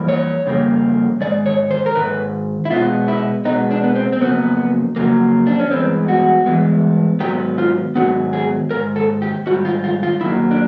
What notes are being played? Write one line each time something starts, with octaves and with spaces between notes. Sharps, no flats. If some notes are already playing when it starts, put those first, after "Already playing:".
Already playing: F2 E3 G3 A#3
C#5
F2 C#3 G3 A#3
G#2 D#3 G#3 D5
C#5
C5
A#4
G#2 D#3 B4
E4
B2 G#3 B3 F4
E4
B2 G#3 B3 D#4
D4
B3
C4
C4
F2 C#3 F#3 A#3 B3
F2 C#3 F#3 A#3
D4
C#4
G2 E3 G#3 B3 C4
F#4
G2 E3 G#3 B3
G#2 D#3 F#3 B3 G4
F4
G#2 D#3 F#3 B3 F#4
G#4
G#2 D#3 A#4
A4
G4
G#2 D#3 G3 F#4
F4
F4
F4
F#2 D#3 F#3 A#3 E4
D4